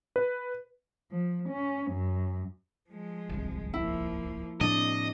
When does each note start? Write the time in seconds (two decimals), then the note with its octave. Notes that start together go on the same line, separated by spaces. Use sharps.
0.16 B4
1.11 F3
1.49 C#4
1.91 F#2
2.90 F3 G#3
3.29 D1 G1 C2
3.74 F3 A#3 E4
4.61 A2 C3 F3 A#3 D4 D#5